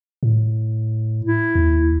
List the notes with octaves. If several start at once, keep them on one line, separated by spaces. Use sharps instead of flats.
A2
E4
D#2